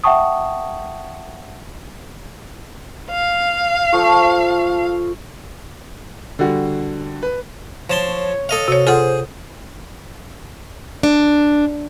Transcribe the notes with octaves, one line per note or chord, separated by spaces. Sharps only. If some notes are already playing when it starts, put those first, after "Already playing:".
E5 F#5 G5 A5 C#6 D#6
F5
F3 A4 C#6
D3 G3 F#4
B4
F3 C#5 A5 C6
A4 D#5 F5
C3 F#4 C#5
F4 G#4 A4 C5 F#5
D4